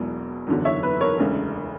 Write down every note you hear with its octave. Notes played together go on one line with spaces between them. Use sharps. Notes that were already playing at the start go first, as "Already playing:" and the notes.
Already playing: E1 E2 B2 F#3
F#1 E2 D3 F#3
C#5 E5
B4
A#4 C#5
E1 D2 C#3